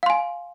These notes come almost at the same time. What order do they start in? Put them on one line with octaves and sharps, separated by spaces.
F5 C6 G#5